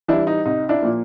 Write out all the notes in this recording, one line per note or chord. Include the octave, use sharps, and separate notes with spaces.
E3 G3 D4 E4
D#4
C2 D#4
D4 E4
A#2 F3 A#3